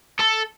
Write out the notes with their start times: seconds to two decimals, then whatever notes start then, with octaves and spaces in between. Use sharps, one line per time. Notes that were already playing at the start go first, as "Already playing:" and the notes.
0.20 A4